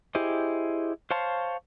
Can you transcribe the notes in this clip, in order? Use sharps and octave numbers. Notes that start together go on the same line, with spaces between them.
E4 G4 G#4 C5 D#5
C5 C#5 F5 A5 C6